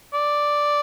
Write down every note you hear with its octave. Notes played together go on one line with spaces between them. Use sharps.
D5